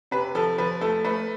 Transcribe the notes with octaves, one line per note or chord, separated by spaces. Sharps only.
C3 B4
F3 A4
F3 B4
A3 A4
A3 B4